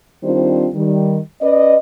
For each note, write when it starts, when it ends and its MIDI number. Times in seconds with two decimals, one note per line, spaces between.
0.24 0.69 51
0.24 0.69 55
0.24 0.69 60
0.24 0.69 62
0.24 0.69 65
0.24 0.69 72
0.75 1.18 51
0.75 1.18 55
1.42 1.77 61
1.42 1.77 71
1.42 1.77 74
1.42 1.77 75